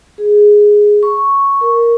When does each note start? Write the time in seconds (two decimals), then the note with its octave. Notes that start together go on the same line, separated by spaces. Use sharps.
0.18 G#4
1.03 C#6
1.61 A#4